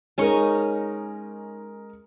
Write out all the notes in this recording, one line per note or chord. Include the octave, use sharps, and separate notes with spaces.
G#3 C#4 D#4 A#4 C#6